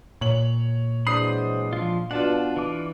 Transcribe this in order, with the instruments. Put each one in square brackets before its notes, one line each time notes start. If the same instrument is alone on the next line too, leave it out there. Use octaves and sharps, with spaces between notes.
[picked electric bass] A#2 [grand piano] C#5 F#7
[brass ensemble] E3 F#3 G#3 [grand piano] D4 D#6 C7 [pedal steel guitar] C5 B5
[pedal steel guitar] F3 F4
[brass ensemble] B2 [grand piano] D4 F4 [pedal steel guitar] F#5 A5
[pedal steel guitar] E3 D6